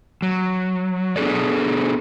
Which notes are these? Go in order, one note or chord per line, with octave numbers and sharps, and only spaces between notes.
F#3
B3 D4 G#4 A4 D5